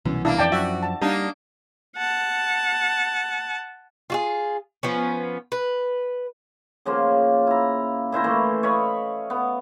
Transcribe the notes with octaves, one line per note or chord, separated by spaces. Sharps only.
C2 F#2 B2 E3
A#3 D4 E4
F2 E3 D5 G5 A5
F#2 F3 F#4 E5
A5
G3 A#3 D4 D#4
F#5 A5
F4 F#4 G#4
F3 B3 C#4
B4
C#3 F3 A#3 F4
E4 A#5
A#2 E4 C5 A#5
E3 A3 A#3
C#5 D#5 F5 B5
B3